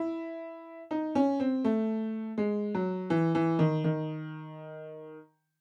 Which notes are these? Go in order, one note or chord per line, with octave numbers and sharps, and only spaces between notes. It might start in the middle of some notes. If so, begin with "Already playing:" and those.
Already playing: E4
D#4
C#4
C4
A3
G#3
F#3
E3
E3
D#3
D#3